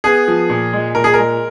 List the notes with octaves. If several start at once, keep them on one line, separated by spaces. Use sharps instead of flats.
B3 G#4
F3
A#2
G#3
A#2 A#4
G#4
G#3 A#4